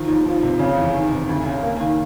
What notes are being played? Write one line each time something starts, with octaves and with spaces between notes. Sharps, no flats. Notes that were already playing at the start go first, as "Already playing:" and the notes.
Already playing: D#3 F3
D#2
F3
C3
C#3
E2
D#3
C3
D2
C#3
A#3
D#3